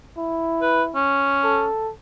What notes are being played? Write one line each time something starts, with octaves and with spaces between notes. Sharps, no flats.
E4
B4
C#4
A4